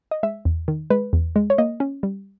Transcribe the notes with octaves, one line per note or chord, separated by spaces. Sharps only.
D#5
G#3 E5
E2
D#3
G#3 B4
E2
G#3
C#5
A#3 D#5
C#4
G3